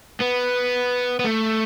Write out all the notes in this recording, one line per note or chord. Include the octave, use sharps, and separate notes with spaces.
B3
B3
A3